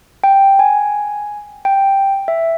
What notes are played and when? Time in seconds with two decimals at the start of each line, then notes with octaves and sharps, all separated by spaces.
0.24 G5
0.59 G#5
1.65 G5
2.28 E5